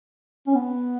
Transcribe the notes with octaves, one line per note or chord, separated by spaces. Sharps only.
C#4
B3